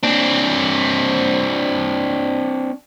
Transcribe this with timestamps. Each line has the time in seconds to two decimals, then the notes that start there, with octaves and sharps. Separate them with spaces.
0.04 C4 D4